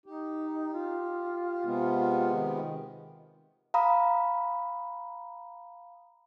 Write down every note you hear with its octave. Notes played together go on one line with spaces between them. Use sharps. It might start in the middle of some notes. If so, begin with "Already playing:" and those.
D#4 G4
F4
C3 G#3 B3
D#3
F5 A#5 B5 D#6